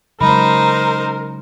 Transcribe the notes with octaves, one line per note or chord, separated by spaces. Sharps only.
C#3 F#3 G#3 D#4 A#4 C5 B5